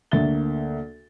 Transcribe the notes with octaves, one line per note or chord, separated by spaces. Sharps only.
D2 A#3 E5 A6 G7